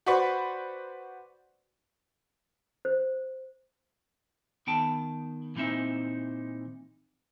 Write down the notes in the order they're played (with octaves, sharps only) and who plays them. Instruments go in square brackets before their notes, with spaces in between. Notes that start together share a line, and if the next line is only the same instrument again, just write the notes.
[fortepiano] F#4 B4 C5 D5 B5 C#6
[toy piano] C5
[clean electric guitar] D#3 B3 G5 A5
A#2 E3 C4 D#4 E5